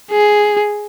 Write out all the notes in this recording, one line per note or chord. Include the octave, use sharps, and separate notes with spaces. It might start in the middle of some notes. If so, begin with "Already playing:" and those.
G#4